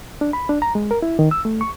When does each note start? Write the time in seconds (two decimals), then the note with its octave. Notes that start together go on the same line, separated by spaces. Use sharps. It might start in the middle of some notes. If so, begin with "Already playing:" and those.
0.21 D4
0.33 B5
0.49 D4
0.62 A#5
0.75 G#3
0.91 A#4
1.02 E4
1.19 D#3
1.31 E6
1.45 A3
1.61 C#6